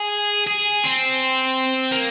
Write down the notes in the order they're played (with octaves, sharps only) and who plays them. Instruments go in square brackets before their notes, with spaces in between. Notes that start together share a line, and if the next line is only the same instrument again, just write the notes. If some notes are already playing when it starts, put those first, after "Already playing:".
Already playing: [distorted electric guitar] G#4
G#4
C4
A#3